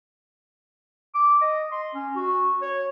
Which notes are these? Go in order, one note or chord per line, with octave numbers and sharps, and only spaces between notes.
D6
D#5
C6
C#4
F#4
C#5